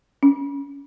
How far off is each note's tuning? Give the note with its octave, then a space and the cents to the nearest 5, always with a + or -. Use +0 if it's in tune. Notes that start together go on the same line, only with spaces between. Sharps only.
C#4 +25